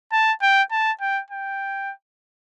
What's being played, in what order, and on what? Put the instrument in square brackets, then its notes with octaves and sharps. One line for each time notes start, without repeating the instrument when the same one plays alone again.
[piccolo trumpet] A5
G5
A5
G5
G5